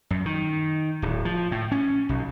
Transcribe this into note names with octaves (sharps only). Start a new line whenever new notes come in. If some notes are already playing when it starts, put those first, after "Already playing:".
F#2
D#3
D1
F3
A2
C#4
B1